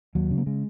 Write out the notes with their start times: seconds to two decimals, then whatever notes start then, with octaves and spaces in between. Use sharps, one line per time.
0.15 D#2 F#3
0.31 C#3
0.38 A#3
0.46 C#3 G#3